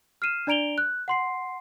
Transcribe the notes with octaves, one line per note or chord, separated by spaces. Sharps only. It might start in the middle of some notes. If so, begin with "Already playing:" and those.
F6 C7 D#7 E7
D4 D5 A#5 D7 F7 G7
F#6
F#5 C6 C7